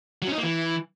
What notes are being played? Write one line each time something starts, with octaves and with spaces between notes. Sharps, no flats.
F#3
C#4
D#4
A#3
E3